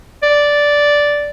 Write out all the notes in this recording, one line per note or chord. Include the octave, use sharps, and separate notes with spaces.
D5